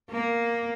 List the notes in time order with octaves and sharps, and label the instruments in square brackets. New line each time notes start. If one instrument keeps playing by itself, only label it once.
[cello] A#3